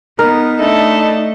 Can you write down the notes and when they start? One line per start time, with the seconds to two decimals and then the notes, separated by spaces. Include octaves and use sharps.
0.19 B3 D#4 A#4
0.60 A3 D4 E4 A4 D#5